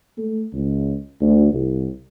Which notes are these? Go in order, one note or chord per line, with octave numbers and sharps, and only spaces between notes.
A3
C#2
D2
C2